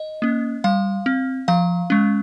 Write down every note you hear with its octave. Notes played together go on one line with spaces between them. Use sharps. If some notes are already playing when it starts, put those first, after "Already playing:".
Already playing: D#5
A#3 C#4
G3 F5
C4
F3 F5
G#3 C#4